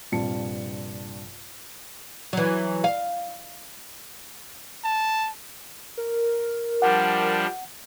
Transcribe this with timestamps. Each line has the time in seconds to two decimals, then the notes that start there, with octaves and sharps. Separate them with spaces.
0.12 A#1 G2 C3 F4 A5 C#7
2.33 E3 F#3
2.84 F5
4.84 A5
5.97 A#4
6.82 F3 G3 D4 F#5